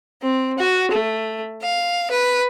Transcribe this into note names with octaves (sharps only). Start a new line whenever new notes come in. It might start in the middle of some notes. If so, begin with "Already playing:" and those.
C4
F#4
A3
F5
B4